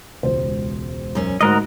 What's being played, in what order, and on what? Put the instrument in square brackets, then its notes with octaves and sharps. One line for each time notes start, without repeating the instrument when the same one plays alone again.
[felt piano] E1 C#2 C5
[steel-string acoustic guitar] F#2 C#4
[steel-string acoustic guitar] D2 G#2 [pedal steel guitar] F#4 A#4 D#5